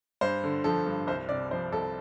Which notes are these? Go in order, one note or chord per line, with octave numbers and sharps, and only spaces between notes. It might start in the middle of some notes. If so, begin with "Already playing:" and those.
G2 C5
D3
F3 A4
G2
C2 C5
C3 D5
F3 C5
C2 A4